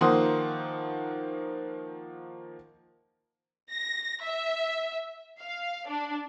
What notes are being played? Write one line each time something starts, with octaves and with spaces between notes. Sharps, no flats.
D#3 F3 A#3 F#5 C6 D#6
A#6
E5
F5
D4